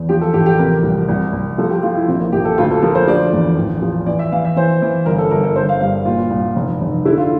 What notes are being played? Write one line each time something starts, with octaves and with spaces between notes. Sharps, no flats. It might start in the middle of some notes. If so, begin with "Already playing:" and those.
Already playing: E2
F3 G4
A4
A1 G4
G4
C3 A#4
C2
C2
C2
F3 A4
G4
F3 F4
E4
A#1 C4
A#3
A#1 G4
A4
D2 F4
A4
F3 A#4
C5
D3 D5
E2
A1
F3
E3 D5
E5
E3 F5
E5
E3 C5
E3
G1 A#4
A4
G1 A#4
A4
G1 C5
F5
G2 F5
A#2 F4
C2
F1
F1
D3 E4
F4